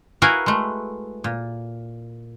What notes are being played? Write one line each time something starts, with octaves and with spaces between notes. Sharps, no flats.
E4 F#4 A#4 B4 F5 G#5
G#3 A3
A#2